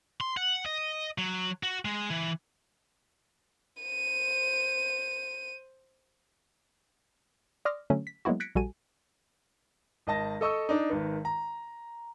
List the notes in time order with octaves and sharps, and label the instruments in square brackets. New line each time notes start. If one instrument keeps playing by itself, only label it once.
[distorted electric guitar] C6
F#5
D#5
F#3
F#4
G#3
E3
[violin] C5 D#7
[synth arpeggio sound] D5 C6 D6 D#6 F6 A#6
D3 F#3 A3 C#4
B6
F#3 G#3 A#3 B3 E4 F#4
F#6 G#6 A#6 B6 C#7 D7
A#1 G3 F#4 A4 G#5 D#7
[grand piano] G#1 D#5 A5 A#6
A4 D#5 C#6 E6
D4 D#4
G#1 D#3 B4
A#5